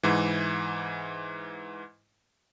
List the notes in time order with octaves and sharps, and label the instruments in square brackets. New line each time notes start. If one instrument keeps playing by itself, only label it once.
[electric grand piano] G#2 E3